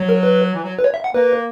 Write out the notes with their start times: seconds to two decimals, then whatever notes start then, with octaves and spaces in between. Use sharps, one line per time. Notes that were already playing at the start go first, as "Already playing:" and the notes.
Already playing: F#3
0.09 A#4
0.23 B4
0.54 E3
0.63 F#3
0.79 B4
0.84 C#5
0.94 E5
1.04 F#5
1.14 A#3 B4